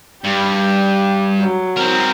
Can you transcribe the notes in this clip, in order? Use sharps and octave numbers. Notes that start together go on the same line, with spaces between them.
G2 G4
F#3
C4 A#4